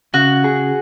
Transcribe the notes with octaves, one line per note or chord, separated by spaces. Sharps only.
C#3 F#4
G#4